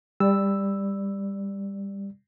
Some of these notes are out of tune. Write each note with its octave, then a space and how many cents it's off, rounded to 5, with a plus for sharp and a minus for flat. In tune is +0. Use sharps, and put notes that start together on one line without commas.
G3 +20 D5 +0 E6 +0